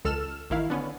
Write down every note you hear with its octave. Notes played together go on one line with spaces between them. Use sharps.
C#2 A4 E6 F6 E7
A1 D#3 E4 F5
D3 B3 C#4